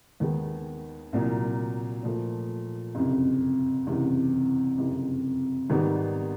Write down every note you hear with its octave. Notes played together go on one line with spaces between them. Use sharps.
D#2 D#3 G#3 B3
C2 A#2 F#3
A#2 F3 A3
F#1 F2 C3
F#1 E2 C3
F#1 F2 C3
G#1 G#2 D#3 G3 B3